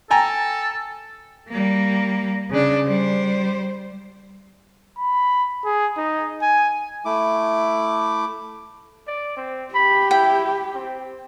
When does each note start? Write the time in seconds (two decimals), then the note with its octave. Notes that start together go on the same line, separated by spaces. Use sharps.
0.10 A4 G5 G#5 A#5
1.50 G3 A#3
2.50 C#3 D4
2.87 G3 C5
4.98 B5
5.65 G#4
5.97 D#4
6.42 G#5
7.05 A3 E4 D6
9.07 D5
9.37 C4
9.74 G4 B5
10.11 E4 G5
10.75 C4